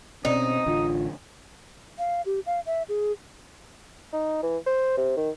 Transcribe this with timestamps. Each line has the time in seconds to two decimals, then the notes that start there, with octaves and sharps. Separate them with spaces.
0.25 B2 C4 C#4 D#4 D#6
0.66 A1 D3 D4 F4
1.99 F5
2.26 G4
2.46 F5
2.66 E5
2.89 G#4
4.13 D#4
4.43 E3
4.66 C5
4.97 C3
5.17 D#3